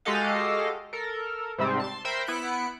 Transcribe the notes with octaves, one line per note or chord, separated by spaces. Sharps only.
G#3 F#4 G4 A4 D#5 F5
A4 A#4
G#2 C3 G3 C4
A5 C6
A#4 C5 E5 G5 B5
B3 E4 F#6 B6 C#7 D7